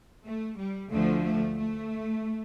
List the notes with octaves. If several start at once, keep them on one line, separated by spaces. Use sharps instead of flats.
A3
G3
D2 D3 F3 A3
A3
A3